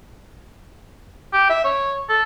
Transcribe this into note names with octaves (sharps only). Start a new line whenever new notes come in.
G4
E5
C#5
A4